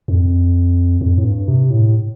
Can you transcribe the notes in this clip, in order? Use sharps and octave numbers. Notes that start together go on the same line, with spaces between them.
F2
F2
A2
G2
C3
A2